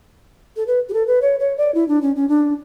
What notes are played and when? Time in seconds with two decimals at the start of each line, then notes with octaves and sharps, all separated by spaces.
0.56 A4
0.67 B4
0.89 G4
0.93 A4
1.07 B4
1.21 C#5
1.39 C#5
1.57 D5
1.74 E4
1.88 D4
2.02 C#4
2.16 C#4
2.29 D4